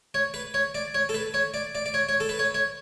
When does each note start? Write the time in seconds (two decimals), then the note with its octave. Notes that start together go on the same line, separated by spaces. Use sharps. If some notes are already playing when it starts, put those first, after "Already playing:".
0.14 C#5
0.34 B4
0.54 C#5
0.75 D5
0.94 C#5
1.09 A4
1.14 B4
1.34 C#5
1.54 D5
1.75 D5
1.86 D5
1.94 C#5
2.09 C#5
2.20 A4
2.29 B4
2.39 C#5
2.54 C#5